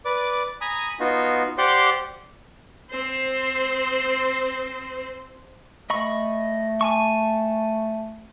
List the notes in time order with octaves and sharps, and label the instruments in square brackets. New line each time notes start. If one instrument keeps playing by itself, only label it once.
[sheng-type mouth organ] B4 D5 D6
G#5 A#5 B5 D#6
B3 D#4 F4 F#4
G4 C5 D5 F#5 G5 C6
[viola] C4 C5
[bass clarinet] A3 [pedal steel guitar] D#5 B5 C#6
[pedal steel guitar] G#5 A5 C#6